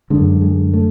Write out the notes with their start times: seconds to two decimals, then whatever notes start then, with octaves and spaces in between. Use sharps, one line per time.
0.10 F#2 D3 G#3
0.41 G#3
0.74 A3